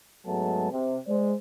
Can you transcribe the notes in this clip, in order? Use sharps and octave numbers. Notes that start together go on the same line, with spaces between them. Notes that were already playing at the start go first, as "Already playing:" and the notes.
G#2 F#3 G#3 A3 B3 A5
C3
G#3 C5 D5